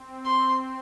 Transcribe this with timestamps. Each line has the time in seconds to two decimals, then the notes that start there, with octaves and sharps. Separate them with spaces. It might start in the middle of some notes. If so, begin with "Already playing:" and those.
Already playing: C4
0.25 C6